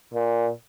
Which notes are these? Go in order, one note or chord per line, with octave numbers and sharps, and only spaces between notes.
A#2